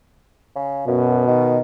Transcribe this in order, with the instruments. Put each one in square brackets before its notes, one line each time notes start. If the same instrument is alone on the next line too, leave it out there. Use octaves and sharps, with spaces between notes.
[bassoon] C#3
[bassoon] F#2 [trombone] B2
[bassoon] D#3